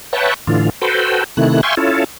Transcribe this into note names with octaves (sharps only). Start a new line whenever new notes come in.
B4 C#5 E5 F#5 G5 A5
A2 D3 E3 F4
F#4 A4 B4 C5 G5
C3 D#3 A3 E4 F#6
E5 F5 G5 G#5 C6 C#6
C#4 E4 F4 A4